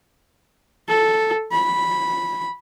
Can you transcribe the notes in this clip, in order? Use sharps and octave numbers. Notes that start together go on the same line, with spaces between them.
A4
B5